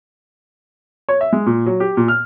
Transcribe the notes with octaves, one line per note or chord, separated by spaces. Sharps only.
C#5
E5
G#3
A#2
F#3
G4
A#2
F6